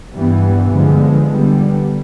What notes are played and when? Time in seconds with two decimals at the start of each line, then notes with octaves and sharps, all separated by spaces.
0.13 G2 E3 G3 B3
0.71 D3 F3 G#3 B3
1.30 D3 G3 B3